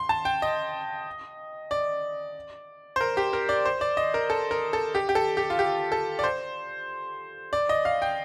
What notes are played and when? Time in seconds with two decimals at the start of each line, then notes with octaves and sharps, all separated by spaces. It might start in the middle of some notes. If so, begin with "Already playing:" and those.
Already playing: C6
0.09 A5
0.25 G5
0.42 D#5
1.71 D5
2.96 C5
3.01 A#4
3.17 G4
3.33 A#4
3.49 D5
3.65 C5
3.81 D5
3.97 D#5
4.14 A#4
4.30 A4
4.51 A#4
4.73 A4
4.95 G4
5.09 G4
5.15 A4
5.37 G4
5.50 F4
5.59 G4
5.92 A4
6.19 D5
6.24 C5
7.53 D5
7.69 D#5
7.85 F5
8.02 G5